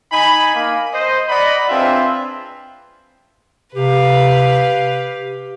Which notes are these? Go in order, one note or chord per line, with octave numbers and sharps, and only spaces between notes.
D#4 G#5 B5
A#3
C5 D#5
D5 D#5 F#5 A#5 B5
C4 D4 F4 G#4 B4 E5
C3 G4 B4 F5